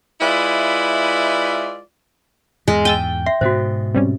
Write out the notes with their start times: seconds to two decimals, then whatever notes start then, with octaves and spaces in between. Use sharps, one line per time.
0.20 G#3 E4 F4 B4 D5 E5
2.68 E2 G#2 G#3
2.85 G5 E6 A6 D#7
3.26 E5 C6
3.41 G#2 B2 F#4 C5
3.94 C3 G3 C#4